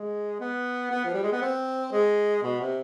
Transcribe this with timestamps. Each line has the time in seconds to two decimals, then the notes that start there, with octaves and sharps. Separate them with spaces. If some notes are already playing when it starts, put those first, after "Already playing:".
Already playing: G#3
0.40 B3
0.91 B3
1.04 F3
1.14 G3
1.23 G#3
1.32 B3
1.42 C4
1.92 G#3
2.43 B2
2.60 C3